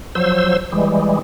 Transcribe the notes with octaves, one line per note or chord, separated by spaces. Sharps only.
F3 F#3 C5 E6
E3 G3 G#3